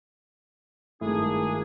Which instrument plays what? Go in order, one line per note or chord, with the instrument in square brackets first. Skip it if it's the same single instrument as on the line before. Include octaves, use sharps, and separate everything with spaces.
[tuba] G#1 [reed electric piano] G2 A3 E4 [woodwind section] A#3 D4 G#4